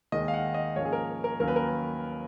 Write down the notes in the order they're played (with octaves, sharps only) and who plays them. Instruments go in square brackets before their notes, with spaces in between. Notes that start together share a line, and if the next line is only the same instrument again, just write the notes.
[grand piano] D#2 D#3 G#3 D#5
F5
F#5
D#5
G#2 F3 A#3 C#4 C#5
G#4
A#4
A#4
D#2 D#3 F#3 A#3 C#4 A#4
B4
A#4